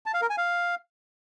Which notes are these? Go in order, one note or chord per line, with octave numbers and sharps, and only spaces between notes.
A5
F5
A#4
G#5
F5